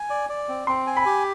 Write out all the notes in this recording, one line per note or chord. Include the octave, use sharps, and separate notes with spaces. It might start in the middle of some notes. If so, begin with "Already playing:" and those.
Already playing: G#5
D5
D5
C4
C4 C6
G#5
B5
G4